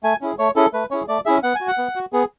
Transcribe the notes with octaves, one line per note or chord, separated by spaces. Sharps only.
A3 G#5
C#4 E4 G#4
A3 C#5
C#4 E4 G#4 A4
A3 B4
C#4 E4 G#4 C#5
A3 D5
C#4 E4 G#4 E5
B3 F#5
G#5
F#4
F#5
B3
F#4
B3 G#4